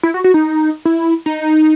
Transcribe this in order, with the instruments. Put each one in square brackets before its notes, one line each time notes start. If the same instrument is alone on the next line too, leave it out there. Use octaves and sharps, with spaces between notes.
[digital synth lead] E4
F#4
F#4
D#4
E4
D#4